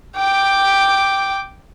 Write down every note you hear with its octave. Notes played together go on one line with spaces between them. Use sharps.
G5 D6